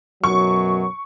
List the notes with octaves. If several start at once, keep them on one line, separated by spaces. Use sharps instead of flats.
F#2 B2 F#3 C#6